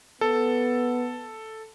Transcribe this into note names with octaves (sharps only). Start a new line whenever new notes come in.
B3 A4